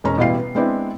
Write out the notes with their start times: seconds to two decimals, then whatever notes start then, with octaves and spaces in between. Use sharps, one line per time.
0.04 E1 G#3 C#4 A#5
0.17 A1 B2 G3 E4 F5 C7
0.37 B3
0.55 G#3 B3 C4 D4 E4